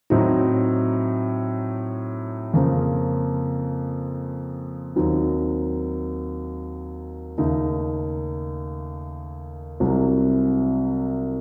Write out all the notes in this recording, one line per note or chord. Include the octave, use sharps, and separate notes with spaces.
A2 F#3 C4 D#4
F2 C#3 F3 A#3
D#2 D#3 F#3 C4 D#4
D#2 C#3 A3 D#4
C2 C3 F#3